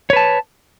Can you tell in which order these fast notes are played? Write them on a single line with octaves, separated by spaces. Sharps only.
C#5 B4 A5